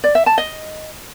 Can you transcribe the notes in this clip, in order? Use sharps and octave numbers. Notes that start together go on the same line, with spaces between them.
D5
E5
A5
D#5